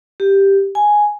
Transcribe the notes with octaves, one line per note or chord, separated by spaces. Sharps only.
G4
G#5